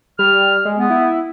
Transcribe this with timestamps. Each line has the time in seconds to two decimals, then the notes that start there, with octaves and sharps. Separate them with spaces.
0.19 G3 F6
0.65 G#3
0.78 B3
0.90 E4